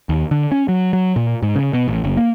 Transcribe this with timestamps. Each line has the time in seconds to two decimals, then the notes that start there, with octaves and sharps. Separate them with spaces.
0.09 D#2
0.31 D3
0.52 C#4
0.68 F#3
0.93 F#3
1.16 A#2
1.43 G#2
1.56 C#3
1.73 B2
1.88 A1
2.04 F#1
2.17 A#3